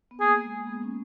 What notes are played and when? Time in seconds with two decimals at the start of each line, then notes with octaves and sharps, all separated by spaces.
0.11 B3
0.20 A#3 G#4
0.33 A#3
0.44 G#3
0.67 B3
0.83 C#4